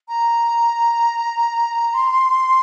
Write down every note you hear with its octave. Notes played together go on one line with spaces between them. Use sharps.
A#5
C6